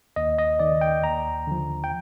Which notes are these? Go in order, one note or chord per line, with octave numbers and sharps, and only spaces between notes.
D#2 D#5
D#5
D#3 D5
G5
D#2 A#5
D3 F3
G5